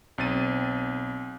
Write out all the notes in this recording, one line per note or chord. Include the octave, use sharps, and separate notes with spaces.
B1 C4 A6 D#7